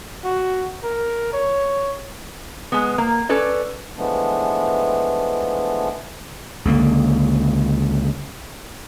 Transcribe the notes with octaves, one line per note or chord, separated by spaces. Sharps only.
F#4
A#4
C#5
G#3 B3
A#3
C#4 A4 B4 D5
E3 F3 G#3 A3 B3 D4
C#2 D3 A#3